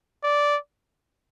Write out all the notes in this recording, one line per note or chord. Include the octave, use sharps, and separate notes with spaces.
D5